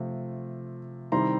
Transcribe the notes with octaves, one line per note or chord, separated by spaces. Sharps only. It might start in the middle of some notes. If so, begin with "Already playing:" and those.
Already playing: C3 F3 A3 F4
C3 D#3 G3 C4 E4 A#5 C6